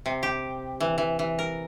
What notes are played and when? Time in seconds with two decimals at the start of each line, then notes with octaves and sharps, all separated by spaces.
0.06 C3
0.23 G4
0.81 E3
0.98 E3
1.19 E3
1.39 A#4